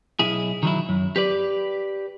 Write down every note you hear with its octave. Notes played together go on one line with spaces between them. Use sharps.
B1 E4 G#4
D#3 F#3 E4
F#2
G4 B4 D5